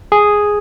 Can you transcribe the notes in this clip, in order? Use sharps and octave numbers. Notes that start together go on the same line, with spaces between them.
G#4